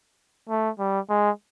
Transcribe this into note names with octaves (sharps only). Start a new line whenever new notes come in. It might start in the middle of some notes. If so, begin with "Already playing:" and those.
A3
G3
G#3